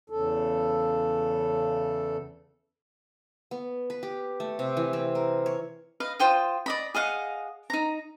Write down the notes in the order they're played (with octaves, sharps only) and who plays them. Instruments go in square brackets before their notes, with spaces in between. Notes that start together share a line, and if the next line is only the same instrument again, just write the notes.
[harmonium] E2 C#3 A4
[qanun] B3
B4
G4
A3
C3
E3
C4
A#4
C#5
[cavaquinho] B4 D#5 F5
F4 C5 G5 D#6
D5 D#5 B5
G#4 D#5 F5 F#5
D#4 A#5